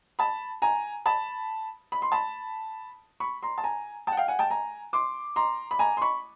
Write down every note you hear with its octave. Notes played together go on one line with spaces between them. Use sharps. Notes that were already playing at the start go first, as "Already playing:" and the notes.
A5 B5
G#5 A#5
A5 B5
B5
C6
A5 B5
B5 C#6
A#5 C6
A5
G#5 A#5
G5 A5
F#5
F5 G5
F#5 G#5
G5 A5
G#5 A#5
C6 D6
A#5 C6
B5
G#5 A#5
C6
B5 C#6